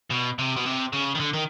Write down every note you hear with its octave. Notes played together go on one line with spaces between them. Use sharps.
B2
C3
B2
C3
C#3
D#3
D3
D#3